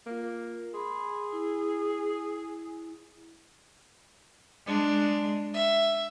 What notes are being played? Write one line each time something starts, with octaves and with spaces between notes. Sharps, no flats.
A#3 F4 A#4
G#4 B5 C6
E4
G#3 D4
E5